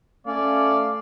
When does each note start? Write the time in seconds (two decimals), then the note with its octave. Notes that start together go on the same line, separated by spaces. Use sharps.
0.27 A3 C#4 D5 F5